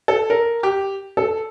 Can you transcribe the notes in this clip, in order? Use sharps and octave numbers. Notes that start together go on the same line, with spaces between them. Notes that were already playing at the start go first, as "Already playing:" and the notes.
A4
A#4
G4
A4